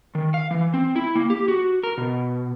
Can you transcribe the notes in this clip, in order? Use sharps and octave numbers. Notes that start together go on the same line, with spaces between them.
D#3
F5
E3
C4
E4
A#3
G4
F#4
A#4
B2